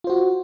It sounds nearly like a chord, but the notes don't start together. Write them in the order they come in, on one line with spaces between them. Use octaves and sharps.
F4 C5 F#4